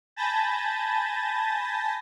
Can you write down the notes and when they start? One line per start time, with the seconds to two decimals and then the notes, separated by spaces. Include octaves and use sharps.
0.16 G#5 A5 B5 G6 A6 A#6